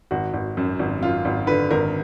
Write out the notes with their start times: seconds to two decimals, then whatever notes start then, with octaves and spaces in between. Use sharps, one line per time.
0.11 G#1 F#4
0.34 G#1
0.57 F#2
0.79 G#1
1.02 F#2 F4
1.25 G#1
1.47 D3 B4
1.71 G#1 A#4